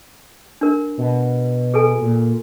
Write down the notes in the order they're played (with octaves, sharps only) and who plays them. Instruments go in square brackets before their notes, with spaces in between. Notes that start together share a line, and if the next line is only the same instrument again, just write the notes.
[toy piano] D4 A#4
[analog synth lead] B2
[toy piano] G#4 A4 G#5
[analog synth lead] A#2